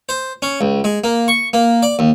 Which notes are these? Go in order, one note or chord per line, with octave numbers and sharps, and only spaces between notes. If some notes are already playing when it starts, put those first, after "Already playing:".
C5
C#4
C#2
G#3
A#3
C#6
A#3
D5
D#2